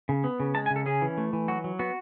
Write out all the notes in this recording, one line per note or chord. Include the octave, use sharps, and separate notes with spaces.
C#3
B3
C#3
G#3 A5
G#5
C#3
A4
C#4 G#4
E3
A3
E3
F#3 F#4
F#3
B3 F#4